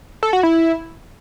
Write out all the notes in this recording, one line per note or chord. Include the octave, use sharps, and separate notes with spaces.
A4
F#4
E4